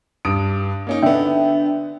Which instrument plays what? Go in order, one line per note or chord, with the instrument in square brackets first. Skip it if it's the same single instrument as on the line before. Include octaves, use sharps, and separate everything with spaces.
[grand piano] G2 D#6 D7
A#3 C#4 D#4
[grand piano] D3 B3 [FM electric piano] D4 E5 G5